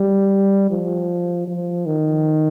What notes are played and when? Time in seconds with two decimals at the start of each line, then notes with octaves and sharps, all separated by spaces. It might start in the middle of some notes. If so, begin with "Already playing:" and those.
Already playing: G3
0.71 F3
1.47 F3
1.86 D#3